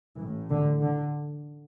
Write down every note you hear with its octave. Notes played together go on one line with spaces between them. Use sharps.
A1 A2 E3
D3
D3